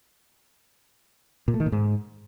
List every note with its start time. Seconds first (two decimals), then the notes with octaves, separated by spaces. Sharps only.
1.48 A#2
1.54 A3
1.60 D#3
1.66 A#2
1.72 G#2